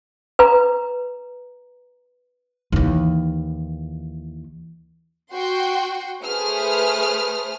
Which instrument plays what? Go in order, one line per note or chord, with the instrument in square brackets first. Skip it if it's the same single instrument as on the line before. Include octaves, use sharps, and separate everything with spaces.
[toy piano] B4 A#5
[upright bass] D#2 E3
[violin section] F#4 G5 C6
A3 G#4 B4 C5 D#6 F6